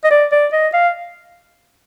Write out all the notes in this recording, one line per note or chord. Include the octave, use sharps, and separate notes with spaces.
D#5
D5
D5
D#5
F5